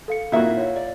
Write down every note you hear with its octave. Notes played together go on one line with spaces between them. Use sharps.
A4 F5 C#7
A#2 A#3 D#4 E4 F#4 E5
C#5 F5
D5